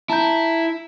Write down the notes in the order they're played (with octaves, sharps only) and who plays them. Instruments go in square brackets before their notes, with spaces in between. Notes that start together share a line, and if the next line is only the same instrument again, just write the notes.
[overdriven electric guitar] E4 [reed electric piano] A5 A#5 G6